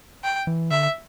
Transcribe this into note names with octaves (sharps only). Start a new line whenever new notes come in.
G5
E3
D3 E5